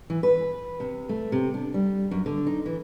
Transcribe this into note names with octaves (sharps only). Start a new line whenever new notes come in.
E3
B4
C3
A3
C3
D4
G3
F#2
D3
D#4
E3